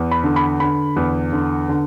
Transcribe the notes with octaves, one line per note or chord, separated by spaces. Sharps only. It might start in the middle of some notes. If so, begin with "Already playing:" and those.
Already playing: E2
B5
D3
B5
D3 B5
E2
D3
D3